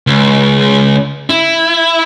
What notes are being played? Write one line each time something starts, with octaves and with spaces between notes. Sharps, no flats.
C#2
E4